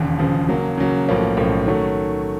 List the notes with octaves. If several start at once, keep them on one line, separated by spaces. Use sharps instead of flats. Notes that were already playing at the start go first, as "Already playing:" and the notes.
Already playing: E1 D#2 C#3
E1 D#2 C#3 F3
C#3 F#3 A#3
C#3 F#3 A#3
B1 A2 F3 A#3 C#4
B1 A2 F3 A#3 C#4
D#3 F#3 A3 C#4